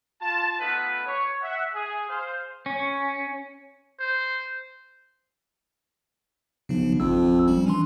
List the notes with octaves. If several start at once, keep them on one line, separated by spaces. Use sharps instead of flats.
F4 A5
A3 B3 D#4 F4 A4 B4
C#5
E5 F#5
G#4
C5 F5
C#4
C5
B1 C#3 F3
G#1 F2 E6
F3 G3 C#4
E3 D4 C6